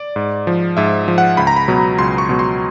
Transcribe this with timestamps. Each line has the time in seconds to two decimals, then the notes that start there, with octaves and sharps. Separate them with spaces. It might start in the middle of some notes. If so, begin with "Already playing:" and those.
Already playing: D5
0.16 G#2
0.47 F3
0.77 G#2 E5
1.08 F3
1.18 F#5
1.37 C#2 B5
1.47 A#5
1.56 B5
1.68 B2 F#3
1.98 C#2 C6
2.18 C#6
2.29 B2 F#3
2.39 C6